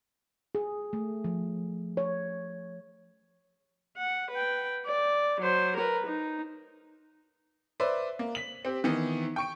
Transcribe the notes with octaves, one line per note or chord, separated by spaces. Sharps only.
G#4
A3
F3
C#5
F#5
B4 G5
D5
F#3 C5
A#4 B4
D#4
B4 C5 D5 E5
A#3
B6 F#7
C4 G4
D#3 E3 B3
G5 C#6 D7